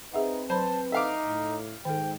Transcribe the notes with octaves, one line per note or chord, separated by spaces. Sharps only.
C4 D#4 G#4 B4 E5 F#5
F#3 C5 A5 B5 C6
D#4 A4 E5 F5 D6
A2
G#2 D#3 A4 G5